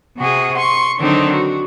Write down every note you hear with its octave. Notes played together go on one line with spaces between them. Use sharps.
C3 F#4 G#4
C6 C#6
D3 D#3 F#3 C4 D4 D#4
F#4